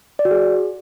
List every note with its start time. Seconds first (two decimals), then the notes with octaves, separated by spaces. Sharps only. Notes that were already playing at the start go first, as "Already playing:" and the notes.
0.19 D5
0.25 F#4
0.31 G#4